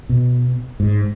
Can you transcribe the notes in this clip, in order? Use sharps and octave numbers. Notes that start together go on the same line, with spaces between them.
B2
G#2